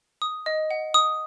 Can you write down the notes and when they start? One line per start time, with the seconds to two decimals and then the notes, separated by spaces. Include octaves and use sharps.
0.22 D#6
0.46 D#5
0.71 F#5
0.94 D#6